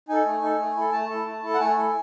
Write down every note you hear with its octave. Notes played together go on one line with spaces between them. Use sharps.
D#4 A4 G#5
A3
D#4 A4
A3
E4 A4
A3 A5
E4 A4
A3
E4 A4
F#5
A3 G#5
E4 A4